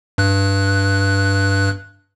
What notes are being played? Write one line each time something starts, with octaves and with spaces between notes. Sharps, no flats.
G2 F#6